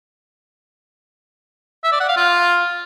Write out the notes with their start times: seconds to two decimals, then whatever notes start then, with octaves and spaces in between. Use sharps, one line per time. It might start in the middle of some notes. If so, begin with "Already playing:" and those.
1.84 E5
1.92 D5
2.00 F#5
2.08 F5
2.17 F4